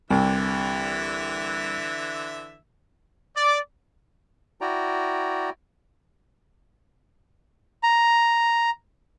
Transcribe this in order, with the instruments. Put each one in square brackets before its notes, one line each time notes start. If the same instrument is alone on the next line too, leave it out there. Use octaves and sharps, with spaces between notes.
[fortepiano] C2 [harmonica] D3 E3 E5
[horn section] D5
[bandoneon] E4 F#4 D5 G5 A#5
[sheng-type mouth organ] A#5